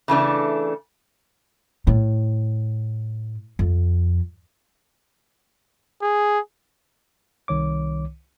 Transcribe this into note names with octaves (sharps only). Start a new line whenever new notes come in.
C#3 E3 A3 D4
A2
F2
G#4
C2 D#3 C#5 D6